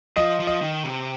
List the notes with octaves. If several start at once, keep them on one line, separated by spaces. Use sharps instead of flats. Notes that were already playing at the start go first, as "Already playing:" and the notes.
F3 D#5
F3
D#5
D#3
C3